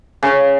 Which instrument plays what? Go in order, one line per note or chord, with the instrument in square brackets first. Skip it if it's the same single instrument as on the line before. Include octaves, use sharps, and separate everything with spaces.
[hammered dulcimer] C#3